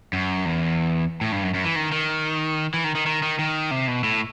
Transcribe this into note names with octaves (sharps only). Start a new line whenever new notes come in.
F#2
E2
A2
G2
F#2
F#2
E3
D#3
D#3
E3
D#3
D#3
D#3
D#3
D#3
C3
B2
A2